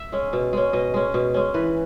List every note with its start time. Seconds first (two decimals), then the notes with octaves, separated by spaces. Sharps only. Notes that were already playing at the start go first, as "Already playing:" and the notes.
Already playing: E5
0.12 G#3 C#4
0.33 B2
0.53 G#3 C#4
0.73 B2 D#5
0.94 G#3 C#4
1.14 B2
1.34 G#3 C#4
1.54 E3 B4